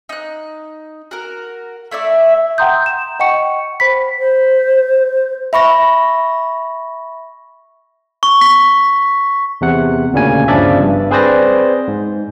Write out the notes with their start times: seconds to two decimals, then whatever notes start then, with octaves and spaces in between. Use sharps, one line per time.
0.09 D#4 F#6
1.11 F#4 A#4
1.91 A3 E4 D5 E5
2.58 F#5 G5 A#5 C6 D#6 G6
2.86 E7
3.19 D#5 F#5 G5 C#6 C#7
3.80 C5 B5 B6
4.19 C5
5.53 E5 B5 C#6 A#6
8.23 C#6
8.41 B6
9.61 E2 C3 F#5
10.13 D2 A#2 C#3 G#5
10.48 G1 C#3 F3 D4 D5 E5
10.80 G2
11.10 C4 G#4 B4 C5 D5 A#6
11.88 G#2